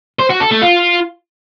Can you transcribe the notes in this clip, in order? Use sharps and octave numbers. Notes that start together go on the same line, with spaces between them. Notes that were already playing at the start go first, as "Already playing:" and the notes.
C5
F#4
A4
A3
F4